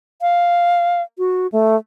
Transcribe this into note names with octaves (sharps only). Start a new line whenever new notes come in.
F5
F#4
A3